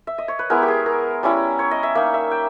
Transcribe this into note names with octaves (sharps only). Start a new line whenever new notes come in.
E5
D#5
C#5
B4
G#3 B3 E4 A#4
G4
G#4
A#4
G3 C#4 E4
C#5
D#5
E5
A#3 D#4 E5
E5
G5